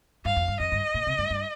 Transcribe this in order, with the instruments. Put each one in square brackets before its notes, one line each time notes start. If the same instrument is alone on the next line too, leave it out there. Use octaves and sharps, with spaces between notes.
[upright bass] G2 [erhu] F5
[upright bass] F2
G2
[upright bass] F2 [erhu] D#5
[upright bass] G2
A#2
C3
G2
G2